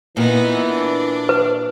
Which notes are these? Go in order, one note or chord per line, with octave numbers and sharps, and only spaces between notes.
A#2 E3 B3 D#4
D4
B4